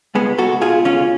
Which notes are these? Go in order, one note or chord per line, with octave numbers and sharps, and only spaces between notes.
C#2 G#3 B3
C#2 F#4 A4
B2 F4 G#4
C#2 C#4 F4